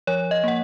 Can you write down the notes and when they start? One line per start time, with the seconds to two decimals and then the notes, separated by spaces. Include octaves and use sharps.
0.07 F3 C#5
0.31 D#5
0.44 A#3 F#5